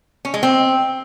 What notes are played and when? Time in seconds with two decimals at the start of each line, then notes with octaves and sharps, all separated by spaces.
0.25 C#4
0.34 G#3
0.43 C4